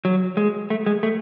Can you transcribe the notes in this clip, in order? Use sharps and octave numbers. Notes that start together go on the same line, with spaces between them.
F#3
G#3
A3
G#3
A3